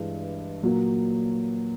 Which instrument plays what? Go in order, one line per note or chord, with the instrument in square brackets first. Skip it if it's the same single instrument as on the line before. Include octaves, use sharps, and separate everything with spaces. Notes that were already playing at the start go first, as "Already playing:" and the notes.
Already playing: [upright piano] G2 E3 G#3
A#2 F#3 A#3